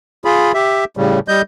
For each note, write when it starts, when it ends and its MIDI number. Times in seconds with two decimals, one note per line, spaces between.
0.25 0.52 65
0.25 0.52 68
0.25 0.52 83
0.54 0.84 67
0.54 0.84 76
0.97 1.19 45
0.97 1.19 49
0.97 1.19 55
1.28 1.42 55
1.28 1.42 75
1.28 1.42 91